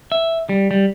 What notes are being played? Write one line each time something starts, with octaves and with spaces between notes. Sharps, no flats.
E5
G3
G3